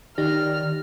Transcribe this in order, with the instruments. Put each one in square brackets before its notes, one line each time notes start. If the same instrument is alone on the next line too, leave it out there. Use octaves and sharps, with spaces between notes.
[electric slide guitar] D#3 D5 [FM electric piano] D#4 G4 A#6 [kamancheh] F6